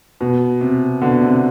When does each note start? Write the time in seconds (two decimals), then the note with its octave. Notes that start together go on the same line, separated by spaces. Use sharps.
0.21 B2
0.61 C3
1.01 B2 D3
1.21 C3